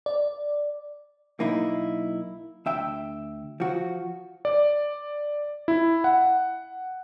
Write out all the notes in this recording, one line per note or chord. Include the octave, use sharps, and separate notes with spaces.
D5
B1 A#3 D#4 E4
D2 E5 G5
F3 F#4
D5
E4
F#5